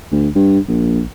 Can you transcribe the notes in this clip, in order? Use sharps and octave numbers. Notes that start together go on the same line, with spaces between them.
D2
G2
A#1